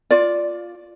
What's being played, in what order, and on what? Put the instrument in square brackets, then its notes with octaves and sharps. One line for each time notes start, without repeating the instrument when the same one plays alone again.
[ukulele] F4 D5